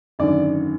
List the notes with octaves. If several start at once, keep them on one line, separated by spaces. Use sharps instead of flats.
G#1 F#2 D3 D5